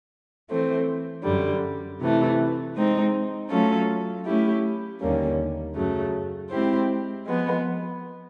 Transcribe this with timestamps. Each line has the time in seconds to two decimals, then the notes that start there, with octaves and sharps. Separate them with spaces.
0.49 E3 A3 C4
1.24 F#2 D3 G3
2.00 C3 E3 A3
2.74 G#3 C4 D#4
3.49 F#3 A3 C#4 F4 A4
4.26 A3 C#4 E4 G4
5.00 D#2 D3 G3 A#3 C#4
5.75 F#2 C#3 F#3 A3
6.51 G#3 C4 E4 G4 C5
7.25 F3 G#3 B3